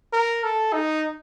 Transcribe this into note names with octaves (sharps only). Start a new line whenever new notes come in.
A#4
A4
D#4